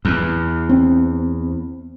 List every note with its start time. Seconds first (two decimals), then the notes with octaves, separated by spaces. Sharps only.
0.05 E2
0.69 C4